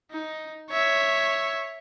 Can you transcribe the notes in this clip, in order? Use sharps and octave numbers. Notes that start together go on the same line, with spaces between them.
D#4
C#5 E5